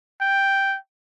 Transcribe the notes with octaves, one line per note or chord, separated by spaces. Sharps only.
G5